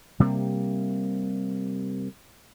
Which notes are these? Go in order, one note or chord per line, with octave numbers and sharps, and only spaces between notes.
C3 G3 A#3